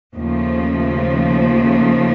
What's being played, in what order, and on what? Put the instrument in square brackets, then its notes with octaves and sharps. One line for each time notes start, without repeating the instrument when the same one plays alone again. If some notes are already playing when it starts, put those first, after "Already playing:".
[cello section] D#2 C#3 F3 A3